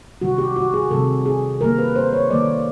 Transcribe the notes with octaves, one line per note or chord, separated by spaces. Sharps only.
C3 D#3 G3 F#4
G4
F#4
G#4
C3 D#3 G3 A4
G#4
D#3 G3 A#3 A#4
B4
C5
C#5
D#3 G3 A#3 D5